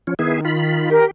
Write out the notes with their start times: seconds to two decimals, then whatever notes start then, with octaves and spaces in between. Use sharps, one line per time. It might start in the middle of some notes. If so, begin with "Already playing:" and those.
0.07 F3 C#4
0.19 D#3 B3 E4 G#4
0.45 F4 B5
0.91 G4 A#4